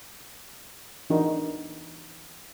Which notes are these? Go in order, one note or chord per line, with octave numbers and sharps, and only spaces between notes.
E3 D4 D#4 F#4 A#4